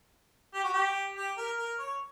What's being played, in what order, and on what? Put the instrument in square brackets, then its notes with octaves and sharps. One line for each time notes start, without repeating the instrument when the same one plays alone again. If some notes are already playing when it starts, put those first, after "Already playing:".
[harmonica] G4
F#4
G4
G4
A#4
A#4
C#5